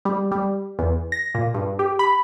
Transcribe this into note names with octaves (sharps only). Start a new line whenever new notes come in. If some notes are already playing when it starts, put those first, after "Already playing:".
G3
G3
E2
A#6
A#2
G2
G4
B5